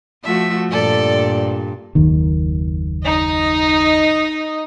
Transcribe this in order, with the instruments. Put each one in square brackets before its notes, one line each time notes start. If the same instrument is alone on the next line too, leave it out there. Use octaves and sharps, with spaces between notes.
[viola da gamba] F3 A3 F#4 [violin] E5
[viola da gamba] G2 A#2 [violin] A4 D5
[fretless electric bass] F#1 D#2 D#3
[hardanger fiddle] D#4 D#5